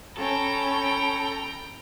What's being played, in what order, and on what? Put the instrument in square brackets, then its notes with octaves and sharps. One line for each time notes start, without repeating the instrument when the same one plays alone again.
[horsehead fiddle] C#4 [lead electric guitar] A4 [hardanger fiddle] G5 A#5 [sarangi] B5